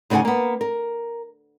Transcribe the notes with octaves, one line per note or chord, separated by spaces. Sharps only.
D2 C#3 D#4 B4 F#5 G#5
A#3 B3
A#4